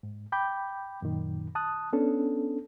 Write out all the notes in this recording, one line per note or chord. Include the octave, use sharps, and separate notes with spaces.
G#2
G5 B5 D6 G6
F#2 A#2 D#3
A5 D#6 F#6
B3 C#4 D4 A4